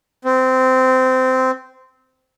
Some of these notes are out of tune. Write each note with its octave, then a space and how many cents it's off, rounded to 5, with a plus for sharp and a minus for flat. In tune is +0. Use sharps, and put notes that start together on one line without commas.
C4 -20